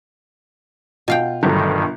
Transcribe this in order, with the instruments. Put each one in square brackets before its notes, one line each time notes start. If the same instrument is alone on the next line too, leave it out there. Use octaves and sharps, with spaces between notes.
[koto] B2 F5 G5 [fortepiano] F4
[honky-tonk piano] G1 [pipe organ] G2 D#3 [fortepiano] F#3 A3